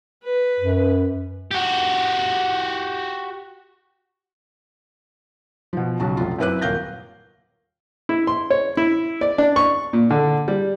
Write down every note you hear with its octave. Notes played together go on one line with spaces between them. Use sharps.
B4
F#2
F#4 G4
B2 F3
B1 C#3 F#4 A5
F1 F4
F#2 C4 E4 B4 D6 F#6
D#1 A#4 F5 G6 A#6
E4
C6
C#5
E4
D5
D4
C#6
A#2
D3
G3